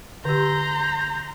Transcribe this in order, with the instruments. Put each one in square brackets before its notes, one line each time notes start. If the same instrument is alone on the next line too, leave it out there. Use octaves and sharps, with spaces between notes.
[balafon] D3 G4 [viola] A#5 C6 [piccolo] G6